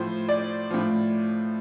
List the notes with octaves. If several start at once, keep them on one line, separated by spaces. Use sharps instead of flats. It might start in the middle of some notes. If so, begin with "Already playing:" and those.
Already playing: A2 F3 C5
D5
A2 F3